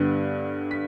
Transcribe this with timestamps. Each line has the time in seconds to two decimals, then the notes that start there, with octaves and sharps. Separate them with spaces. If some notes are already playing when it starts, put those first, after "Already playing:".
Already playing: G2 D3 G3 B3
0.71 B6